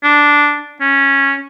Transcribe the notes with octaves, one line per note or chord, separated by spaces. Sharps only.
D4
C#4